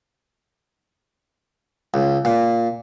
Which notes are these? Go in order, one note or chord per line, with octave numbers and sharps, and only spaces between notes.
C#2
A#2